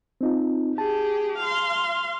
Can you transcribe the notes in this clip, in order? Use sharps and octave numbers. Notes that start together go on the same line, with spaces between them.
C4 D#4 F4
G4 G#4 A5
F5 C6